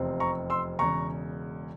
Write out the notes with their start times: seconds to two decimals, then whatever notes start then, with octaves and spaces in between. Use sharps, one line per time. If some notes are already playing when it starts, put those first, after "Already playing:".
Already playing: F1 E2 C3 F3 C4
0.20 A#5 C#6
0.50 C6 E6
0.79 E1 E2 C#3 A#5 C#6